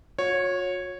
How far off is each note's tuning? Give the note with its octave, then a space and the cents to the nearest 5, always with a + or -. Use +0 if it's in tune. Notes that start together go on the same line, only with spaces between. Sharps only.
F#4 -45 C#5 -10